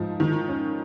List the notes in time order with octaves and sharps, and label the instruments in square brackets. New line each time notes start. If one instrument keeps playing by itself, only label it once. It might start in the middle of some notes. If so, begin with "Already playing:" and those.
Already playing: [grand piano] G#2 [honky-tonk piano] F3
[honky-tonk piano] D#3
C#4